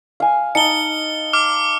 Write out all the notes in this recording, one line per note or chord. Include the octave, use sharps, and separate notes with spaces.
F5 G#5
D#4 A5 C#7 G7
D6 F6